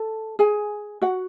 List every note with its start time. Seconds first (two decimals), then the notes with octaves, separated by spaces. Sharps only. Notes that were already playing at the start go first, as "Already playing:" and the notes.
Already playing: A4 A5
0.39 G#4 G#5
1.02 F#4 F#5